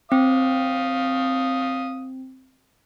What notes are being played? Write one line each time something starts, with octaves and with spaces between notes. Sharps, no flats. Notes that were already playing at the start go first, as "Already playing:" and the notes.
C4 F5 D#6